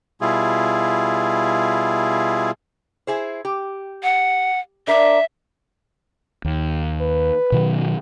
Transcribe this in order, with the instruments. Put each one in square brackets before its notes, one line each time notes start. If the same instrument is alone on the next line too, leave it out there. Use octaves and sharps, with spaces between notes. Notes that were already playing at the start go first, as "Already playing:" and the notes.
[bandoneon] B2 G3 E4 F4 G#4
[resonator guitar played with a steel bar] E4 G#4 C5
G4
[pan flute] F#5
[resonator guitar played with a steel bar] D4 A#4 [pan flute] E5
[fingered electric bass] D#2
[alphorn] B4
[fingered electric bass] B2 D#3 F#3